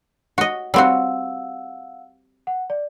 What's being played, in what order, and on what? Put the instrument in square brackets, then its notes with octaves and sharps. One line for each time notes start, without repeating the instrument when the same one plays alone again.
[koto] F#4 D#5
[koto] G3 C4 F#4 [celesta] F5 F#5 E6
[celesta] F#5
D5